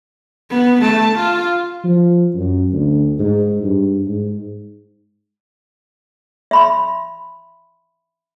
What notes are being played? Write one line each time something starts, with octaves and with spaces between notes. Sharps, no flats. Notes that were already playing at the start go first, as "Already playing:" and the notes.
B3
A3 A5
F4
F3
F#2
D2
G#2
G2
G#2
E5 B5 C6